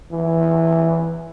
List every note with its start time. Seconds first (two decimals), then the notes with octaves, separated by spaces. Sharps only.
0.12 E3